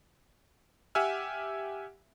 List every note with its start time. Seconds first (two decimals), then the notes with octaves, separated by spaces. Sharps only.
0.95 G4 E5 F#5 G#5 E6 F6